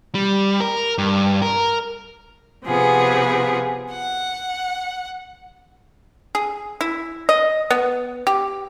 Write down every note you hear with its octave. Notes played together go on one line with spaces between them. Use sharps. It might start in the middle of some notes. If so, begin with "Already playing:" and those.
G3
A#4
G2
A#4
C3 F3 B3 G#4
F#5
G#4
E4
D#5
B3
G4